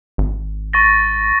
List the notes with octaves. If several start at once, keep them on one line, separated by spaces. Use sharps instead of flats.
G#1
C#6 A6 A#6